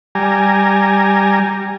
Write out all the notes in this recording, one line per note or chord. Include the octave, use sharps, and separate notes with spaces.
G3 G#5 A#5